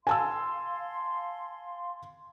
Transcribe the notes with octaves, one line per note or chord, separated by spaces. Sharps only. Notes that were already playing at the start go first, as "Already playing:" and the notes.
F5 G#5 A5 C6 E6